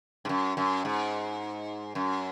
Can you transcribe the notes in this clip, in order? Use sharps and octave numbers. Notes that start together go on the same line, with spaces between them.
G#2
F#2
F#2
G#2
F#2